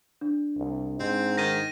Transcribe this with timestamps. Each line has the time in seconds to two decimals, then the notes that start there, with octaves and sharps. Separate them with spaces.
0.21 D4
0.57 C2
1.00 G#2 C4
1.37 D#3 A#6 D#7